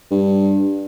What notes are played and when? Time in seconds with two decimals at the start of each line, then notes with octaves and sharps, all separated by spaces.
0.11 G2